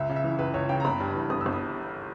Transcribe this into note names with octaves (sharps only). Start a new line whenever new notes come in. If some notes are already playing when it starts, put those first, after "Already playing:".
Already playing: C#2 E5
C#3
E5
E3
C#2 B4
C#2 C#5
C#3 G5
A#5
G1 B5
G2
E3
G1 D#6
E6
G1
D#6